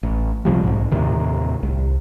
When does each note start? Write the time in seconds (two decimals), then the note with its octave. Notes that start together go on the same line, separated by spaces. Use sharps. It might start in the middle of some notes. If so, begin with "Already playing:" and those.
0.03 A1
0.45 C#2 C3 F3 G3
0.64 B1 G#2
0.91 D#2 A2 C3 D#3
1.63 C2